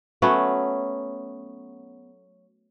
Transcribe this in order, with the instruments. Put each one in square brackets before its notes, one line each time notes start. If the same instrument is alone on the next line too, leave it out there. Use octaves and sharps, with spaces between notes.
[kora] F#3 A3 B3 C#4